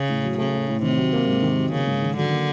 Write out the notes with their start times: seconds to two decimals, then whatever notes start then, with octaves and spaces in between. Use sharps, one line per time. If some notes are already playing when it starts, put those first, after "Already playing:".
Already playing: C#3
0.09 A2
0.24 F#3
0.38 C#3 A3
0.53 A2
0.68 A2
0.83 C3 D#3
0.97 F#3
1.13 A#3
1.27 G#2
1.42 D#3
1.57 F#3
1.71 C#3 A#3
1.87 G#2
2.02 D#3
2.17 D3 F#3
2.31 A#3